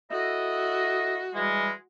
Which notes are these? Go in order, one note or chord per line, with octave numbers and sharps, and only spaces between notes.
E4 F#4 A4 D#5
E3 G3 G#3